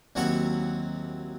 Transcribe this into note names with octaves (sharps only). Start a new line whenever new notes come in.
D#2 F#3 C4 E4 F#5 C#6